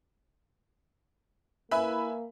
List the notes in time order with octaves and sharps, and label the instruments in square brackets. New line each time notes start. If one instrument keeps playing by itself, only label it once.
[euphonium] A#3 [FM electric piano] E4 B4 [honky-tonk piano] E5 G#5 B5